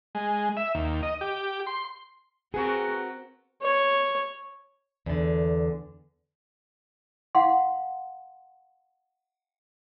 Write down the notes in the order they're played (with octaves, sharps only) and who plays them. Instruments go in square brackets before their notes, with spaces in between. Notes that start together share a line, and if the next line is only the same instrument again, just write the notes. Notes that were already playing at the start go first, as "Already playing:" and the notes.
[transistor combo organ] G#3
E5
D#2
D#5
G4
C6
[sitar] B3 F#4 A#4 [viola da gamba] C4 [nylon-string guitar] G#4
[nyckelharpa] C#5
[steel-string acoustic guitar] E2 D3
[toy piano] F5 F#5 C6